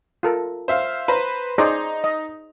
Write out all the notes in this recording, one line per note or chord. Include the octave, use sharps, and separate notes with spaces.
F4 A4 A#4
C5 E5 F5
B4 C5 A#5
D#4 G#4 C5 D5 A#5
D#5